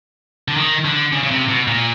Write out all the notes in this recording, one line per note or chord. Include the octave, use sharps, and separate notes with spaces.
D3
D#3
D3
C#3
C#3
C3
B2
A#2